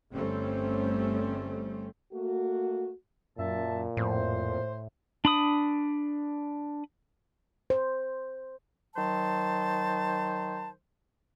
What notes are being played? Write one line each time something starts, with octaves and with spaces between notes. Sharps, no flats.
G1 G3 A3 C4 C#4
A3 A#3 F#4
F#2 A#2 E5 A5
F2 A2 C5
D4 B5 D#6
C5
D#3 F#3 C5 A5